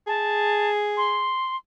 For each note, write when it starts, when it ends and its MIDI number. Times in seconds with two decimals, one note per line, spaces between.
0.08 1.36 68
0.08 0.70 81
0.97 1.56 84